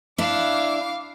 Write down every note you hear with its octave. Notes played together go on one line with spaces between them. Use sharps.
D4 E4 F5 D6